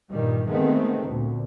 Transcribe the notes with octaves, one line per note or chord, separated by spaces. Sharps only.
G2 A#2 D#3 G3
D#3 G#3 A3 B3 C4
D2 A#2